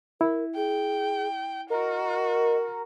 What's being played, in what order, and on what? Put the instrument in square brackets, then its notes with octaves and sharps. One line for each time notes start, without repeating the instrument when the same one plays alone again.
[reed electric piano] E4 [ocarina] A#4
[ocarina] G#4 [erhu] G5
[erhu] F#4 [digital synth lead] A#4 [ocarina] D#5